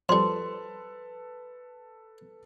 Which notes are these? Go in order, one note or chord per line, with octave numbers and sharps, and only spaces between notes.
F2 G3 A4 B4 C6